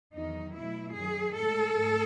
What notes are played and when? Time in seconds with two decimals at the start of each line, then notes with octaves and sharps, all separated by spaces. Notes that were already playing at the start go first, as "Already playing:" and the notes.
0.14 E2 D#3 F#3 D#4
0.55 B2 F#3 A3 E4
0.95 F#2 D#3 F#3 G#4
1.35 A2 G#3 A4
1.74 G#2 A3